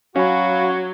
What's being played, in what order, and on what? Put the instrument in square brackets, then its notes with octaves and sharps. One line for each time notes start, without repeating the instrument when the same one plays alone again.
[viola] F#3 [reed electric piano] C#4 [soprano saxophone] F#4 [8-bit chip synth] F5 B5